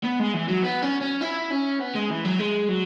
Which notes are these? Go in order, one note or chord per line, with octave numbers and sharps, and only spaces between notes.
B3
G#3
E3
F#3
B3
C#4
C#4
E4
C#4
B3
G#3
E3
F#3
G#3
F#3